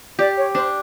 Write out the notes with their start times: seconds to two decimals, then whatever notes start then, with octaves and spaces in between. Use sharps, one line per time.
0.19 G4 D5
0.37 C#5
0.55 D4 C5